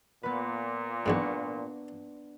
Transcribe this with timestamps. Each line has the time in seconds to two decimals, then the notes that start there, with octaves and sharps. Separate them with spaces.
0.23 A#2 B3 B4
1.06 B1 E2 G#2 B3 D4 C#6